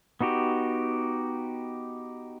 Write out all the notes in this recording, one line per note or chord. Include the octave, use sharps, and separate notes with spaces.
B3 D#4 F#4 G4